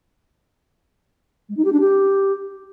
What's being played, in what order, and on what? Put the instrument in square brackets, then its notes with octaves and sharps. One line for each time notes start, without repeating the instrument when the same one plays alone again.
[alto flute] G#3
D#4
G4
D4
G4